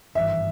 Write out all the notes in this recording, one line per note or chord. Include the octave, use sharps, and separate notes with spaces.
G#1 G2 E3 E5